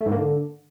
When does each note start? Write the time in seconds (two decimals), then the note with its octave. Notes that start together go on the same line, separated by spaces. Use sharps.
0.01 A3
0.06 G#2
0.12 A#3
0.17 D3